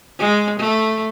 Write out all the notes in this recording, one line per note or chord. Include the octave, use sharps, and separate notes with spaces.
G#3
A3